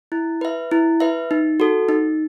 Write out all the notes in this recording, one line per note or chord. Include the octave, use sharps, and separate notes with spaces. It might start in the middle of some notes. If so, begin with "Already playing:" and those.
E4
B4 E5
E4
B4 E5
D#4
F#4 A4
D#4